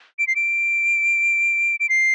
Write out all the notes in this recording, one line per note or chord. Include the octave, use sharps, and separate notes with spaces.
D7
C7
D7
D7
C7